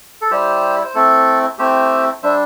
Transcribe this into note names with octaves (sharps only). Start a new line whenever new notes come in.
A4
G3 E4 G4 C5
C5
A3 C4 E4 A4
A3 C4 E4 G4 C5
G3 D4 C5 E5